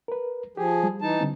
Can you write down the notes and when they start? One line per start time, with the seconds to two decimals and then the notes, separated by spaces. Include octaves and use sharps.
0.08 A#4 B4
0.57 F3 G4 G#4
0.83 G3
1.01 E3 D#4 A5
1.20 D3 G3 C4